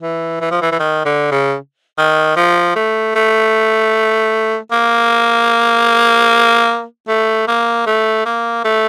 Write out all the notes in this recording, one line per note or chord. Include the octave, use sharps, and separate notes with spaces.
E3
E3
F3
E3
E3
D#3
D3
C#3
D#3
F3
A3
A3
A#3
A3
A#3
A3
A#3
A3